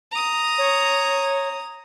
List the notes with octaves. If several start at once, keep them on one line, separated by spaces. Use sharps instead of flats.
A#5 D#6
C#5